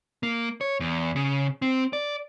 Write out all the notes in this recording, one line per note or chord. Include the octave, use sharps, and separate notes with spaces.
A#3
C#5
E2
C#3
C4
D5